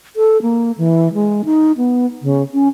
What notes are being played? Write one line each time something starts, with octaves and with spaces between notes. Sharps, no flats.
A4
A#3
E3
G#3
D#4
B3
C#3
C#4